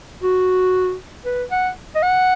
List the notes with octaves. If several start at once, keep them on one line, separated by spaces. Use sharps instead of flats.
F#4
B4
F#5
D#5
F#5